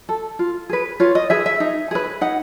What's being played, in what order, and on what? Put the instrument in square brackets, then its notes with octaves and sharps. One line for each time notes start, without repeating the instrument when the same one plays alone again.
[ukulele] A4
F4
G#4 B4
F4 C#5
D#5
G#4 B4 E5
E5
D#4
G#4 B4
D#4 F#5